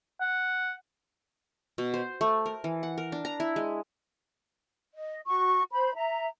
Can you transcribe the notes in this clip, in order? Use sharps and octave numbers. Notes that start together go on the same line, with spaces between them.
F#5
B2
C5
A3
A#4
E3
F#5
A#4
D4
A#5
E4
G#3
D#5
F#4 C#6
C5 B5
E5 A#5